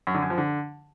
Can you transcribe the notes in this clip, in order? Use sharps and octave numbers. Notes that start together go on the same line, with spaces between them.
F#2
D3
F#2
F3
D3